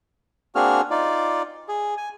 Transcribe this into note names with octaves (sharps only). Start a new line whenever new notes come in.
A#3 C4 D4 F#4 G#4 F6
D#4 F4 D5
G#4
G#5